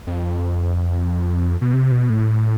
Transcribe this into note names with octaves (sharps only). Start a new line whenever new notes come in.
F2
B2
C3
B2
A2